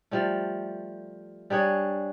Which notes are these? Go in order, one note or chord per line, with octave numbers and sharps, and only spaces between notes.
F3 G3 A3
G3 D4 G#4 C#5